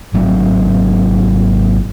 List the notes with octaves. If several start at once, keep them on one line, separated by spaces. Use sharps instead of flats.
G#1 F#3 A3 C4